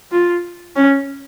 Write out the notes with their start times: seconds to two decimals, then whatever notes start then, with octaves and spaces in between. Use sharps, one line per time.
0.12 F4
0.76 C#4